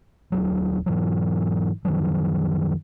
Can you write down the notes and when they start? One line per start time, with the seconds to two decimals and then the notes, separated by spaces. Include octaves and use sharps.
0.32 D#1 C#2 F#3
0.86 G#2 E3 F#3
1.85 F#2 D#3 F3 F#3